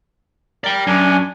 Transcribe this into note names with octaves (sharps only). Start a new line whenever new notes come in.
A#4 D5 G5
F#2 D4 G#5